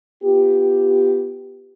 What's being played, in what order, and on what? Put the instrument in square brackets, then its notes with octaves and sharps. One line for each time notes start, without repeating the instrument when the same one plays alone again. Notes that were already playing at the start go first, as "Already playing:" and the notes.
[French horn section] B3 F4 G4